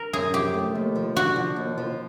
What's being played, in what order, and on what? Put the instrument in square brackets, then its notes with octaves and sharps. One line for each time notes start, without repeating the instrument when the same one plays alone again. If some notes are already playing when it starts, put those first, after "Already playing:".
Already playing: [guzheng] A#4
[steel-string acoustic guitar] F#2 [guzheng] G#4
[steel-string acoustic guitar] F3 [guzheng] G4
[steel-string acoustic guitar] A3
D#2
F3
[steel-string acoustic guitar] D3 [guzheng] F#4
[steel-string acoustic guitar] F3
D#2
F3